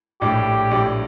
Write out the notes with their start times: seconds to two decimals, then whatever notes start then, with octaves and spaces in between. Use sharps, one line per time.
0.21 A#1 A2 G3 D4 G4
0.71 A#1 A2 G3 D4